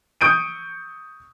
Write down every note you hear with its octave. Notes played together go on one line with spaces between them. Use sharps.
C#6 D#6 G6 D7 D#7